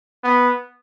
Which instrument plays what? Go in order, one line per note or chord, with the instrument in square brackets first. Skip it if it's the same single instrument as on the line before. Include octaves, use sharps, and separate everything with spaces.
[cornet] B3